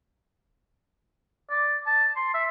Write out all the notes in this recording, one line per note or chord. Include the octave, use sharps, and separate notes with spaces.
D5
A5
C6
E5